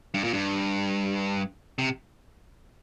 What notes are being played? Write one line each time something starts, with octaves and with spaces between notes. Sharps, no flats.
G2
A#2
G2
C3